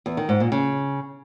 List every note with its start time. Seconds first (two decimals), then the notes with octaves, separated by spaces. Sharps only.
0.06 E2
0.17 D#3
0.29 G#2
0.40 A#2
0.52 C#3